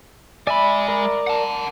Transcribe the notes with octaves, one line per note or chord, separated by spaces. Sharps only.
G#3 D5 E5 G#5 B5
A#4 D5
F#5 A5